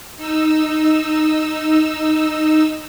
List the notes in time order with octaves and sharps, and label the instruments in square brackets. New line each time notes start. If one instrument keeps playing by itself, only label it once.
[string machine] D#4 E6